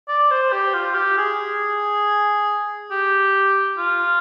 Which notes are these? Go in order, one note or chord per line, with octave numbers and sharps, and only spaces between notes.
D5
C5
G4
F4
G4
G#4
G4
F4